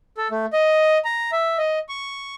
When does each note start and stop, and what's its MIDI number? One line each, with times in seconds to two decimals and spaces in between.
0.17 0.28 69
0.31 0.46 57
0.53 0.98 75
1.04 1.31 82
1.32 1.58 76
1.58 1.79 75
1.89 2.35 85